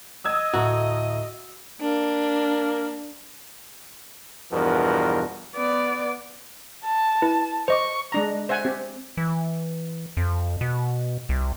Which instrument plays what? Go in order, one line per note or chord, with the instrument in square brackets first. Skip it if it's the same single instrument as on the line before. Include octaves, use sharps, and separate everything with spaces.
[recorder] D#5 [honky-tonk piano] D#6 E6 G#6
[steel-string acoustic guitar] D2 A2 A#5 [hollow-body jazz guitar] F#4
[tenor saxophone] A#3 [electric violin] D4
[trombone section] E2 G2 B2 F3 A#4
[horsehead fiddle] B3 D5
[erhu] A5
[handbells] E4 B4
[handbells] C5 D#5 D6 [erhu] C#6
[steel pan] G#3 D4 A#5
C5 E5 F#5 G#5
C4 G4
[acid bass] E3
F2
B2
C2